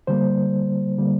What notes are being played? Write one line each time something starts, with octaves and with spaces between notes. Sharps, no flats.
D3 G3 A#3 C5
D3 G3 A#3